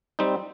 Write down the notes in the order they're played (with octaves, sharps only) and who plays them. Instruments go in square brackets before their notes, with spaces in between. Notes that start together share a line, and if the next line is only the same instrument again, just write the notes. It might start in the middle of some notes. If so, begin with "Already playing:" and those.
[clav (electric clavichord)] G3 C4 D#4